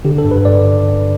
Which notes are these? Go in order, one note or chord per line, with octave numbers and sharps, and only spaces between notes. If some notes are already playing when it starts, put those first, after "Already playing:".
D3 G4
A4
G2
B4
D5